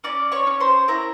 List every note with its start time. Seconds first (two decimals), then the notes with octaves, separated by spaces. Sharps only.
0.04 C#4 D5 D6
0.32 C#5 C#6
0.47 C#4
0.60 C5 C6
0.88 E4 A#4 A#5